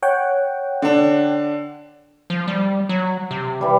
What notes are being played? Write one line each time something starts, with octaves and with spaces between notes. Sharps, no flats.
C#5 F#5 G5
D3 D4
F3
G3
F#3
C3
E3 G3